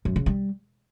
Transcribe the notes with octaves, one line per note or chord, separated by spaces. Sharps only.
F#2
C#3
G3